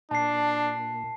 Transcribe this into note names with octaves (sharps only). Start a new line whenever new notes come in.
A#2 D4 A5 C7